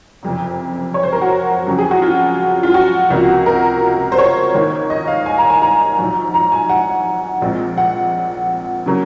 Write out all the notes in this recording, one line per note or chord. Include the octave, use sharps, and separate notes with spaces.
F#1 F2 C3
C#5
C5
A#4
F#4
F2 C#3 F#3
G#4
F#4
F4
F4
F#4
C#2 C3 F3 A#3
A#4
C5
C#5
G#1 G#2 D#3 A#3
D#5
F5
G#5
A#5
G#5
A#5
A#1 G#2 F#3
A#5
G#5
F#5
A#1 A#2 G#3 C4
F#5
C#3 F#3 A#3